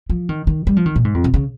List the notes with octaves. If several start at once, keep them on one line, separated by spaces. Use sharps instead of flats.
F3
D#3
D#3
G3
F3
D#3
A#2
G#2
F2
C3
C#3